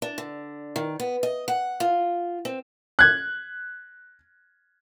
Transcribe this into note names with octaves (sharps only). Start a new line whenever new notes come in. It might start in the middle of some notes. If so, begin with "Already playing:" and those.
D4
D3
D#3
B3
D#5
F#5
F4
C4
F#6 G#6